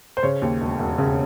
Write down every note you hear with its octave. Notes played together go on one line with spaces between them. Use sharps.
C5
C#3 C#5
D#2
E1
E1
C#3